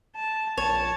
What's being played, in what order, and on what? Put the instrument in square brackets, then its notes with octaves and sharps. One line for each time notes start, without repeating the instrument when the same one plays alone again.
[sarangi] A5
[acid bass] A#1 [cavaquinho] C#5 [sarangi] A5